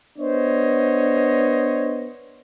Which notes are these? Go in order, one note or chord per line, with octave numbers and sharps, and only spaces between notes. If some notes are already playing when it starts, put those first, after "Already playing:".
B3 D4 C5 C#5 D#5